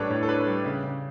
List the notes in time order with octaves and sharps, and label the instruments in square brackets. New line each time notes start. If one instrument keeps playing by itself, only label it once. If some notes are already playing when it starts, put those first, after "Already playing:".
Already playing: [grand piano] A2 G3 D4 A4 B4 C#5 D5
A2
A4
D4 B4
G3
C#3
C#3